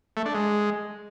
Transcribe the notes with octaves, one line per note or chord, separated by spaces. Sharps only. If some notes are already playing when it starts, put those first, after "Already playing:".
A3
D4
G#3